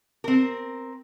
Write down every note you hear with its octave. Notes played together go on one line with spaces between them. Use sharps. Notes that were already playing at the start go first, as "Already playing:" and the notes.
C4 A#4